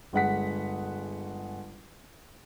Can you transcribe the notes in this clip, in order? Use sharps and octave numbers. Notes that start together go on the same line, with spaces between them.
G1 G#3 F#5 B6